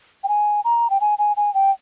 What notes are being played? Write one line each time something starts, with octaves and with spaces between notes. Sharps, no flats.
G5
G#5
A#5
G5
G#5
G#5
G#5
G5